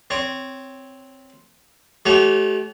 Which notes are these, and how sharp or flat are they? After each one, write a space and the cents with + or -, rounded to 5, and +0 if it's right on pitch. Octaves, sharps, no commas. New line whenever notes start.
C4 +0 C#5 +0
A3 -40 G4 -45 C#5 -10